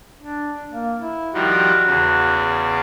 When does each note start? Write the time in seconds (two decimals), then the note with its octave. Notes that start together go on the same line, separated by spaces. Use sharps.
0.19 D4
0.70 A#3
1.00 E4
1.34 D#3 F3 G3 F#4
1.86 E2 C#3